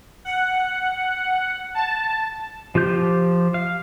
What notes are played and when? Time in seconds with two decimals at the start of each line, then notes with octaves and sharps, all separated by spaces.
0.25 F#5
1.75 A5
2.75 F3 F4 G4 G6
3.54 F5